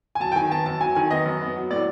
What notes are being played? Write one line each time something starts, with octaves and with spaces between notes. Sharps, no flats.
G#5
F#3 A5
G5
D#3 G#5
B3 A5
F#2 A5
F#3 G#5
D#3 G#5
B3 D#5
F#2
B3
F#3
A2 D5